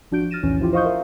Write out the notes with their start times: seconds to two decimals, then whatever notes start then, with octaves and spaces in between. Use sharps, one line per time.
0.11 G#1 F3 D4 F#4 G6 D7
0.31 F6 A6 A#6 D#7 E7
0.43 B1 E2 A2 E3 C#4
0.60 F3 E4 F4 G4
0.73 C5 D#5 F5 C#6 D#6 G6
0.85 A#4 E5 F5